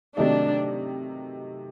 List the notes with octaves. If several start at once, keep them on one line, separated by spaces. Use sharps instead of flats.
C3 D#3 F#3 A3 D4 D#4